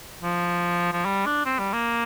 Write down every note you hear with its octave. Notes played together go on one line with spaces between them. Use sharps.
F3
F3
G3
D4
C4
G3
A#3